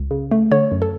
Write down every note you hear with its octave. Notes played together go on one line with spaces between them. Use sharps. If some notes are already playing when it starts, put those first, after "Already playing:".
Already playing: C#2
C#3
A3
D3 C#5
F#2
A4